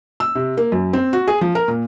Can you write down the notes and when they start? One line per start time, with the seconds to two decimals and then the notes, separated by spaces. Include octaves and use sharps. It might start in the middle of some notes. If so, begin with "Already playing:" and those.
0.20 E6
0.35 C3
0.57 A#3
0.72 F#2
0.93 C4
1.13 F#4
1.28 G#4
1.41 F3
1.55 A#4
1.68 A#2